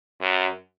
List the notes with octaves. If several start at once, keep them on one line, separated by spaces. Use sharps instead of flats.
F#2